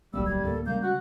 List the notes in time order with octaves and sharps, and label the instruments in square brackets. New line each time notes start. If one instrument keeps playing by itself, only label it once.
[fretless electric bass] D1 B1 A#3 [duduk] G3 [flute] E6
[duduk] G3 [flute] G#6
[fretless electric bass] D2 A2 A#3 [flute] A4
[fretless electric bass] C#3 G3 G#3 [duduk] A#3 [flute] G6
[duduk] F#4 [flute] F#6